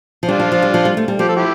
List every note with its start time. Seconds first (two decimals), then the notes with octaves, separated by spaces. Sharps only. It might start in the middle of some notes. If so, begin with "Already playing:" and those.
0.23 F3
0.29 G3 D4 F4
0.40 F3
0.52 F3
0.62 G3
0.74 F3
0.85 G3
0.97 A3
1.08 G3
1.19 F3 G4
1.29 A4
1.36 E4 G4